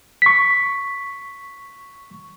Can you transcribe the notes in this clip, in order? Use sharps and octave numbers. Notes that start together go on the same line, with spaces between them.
C#6 B6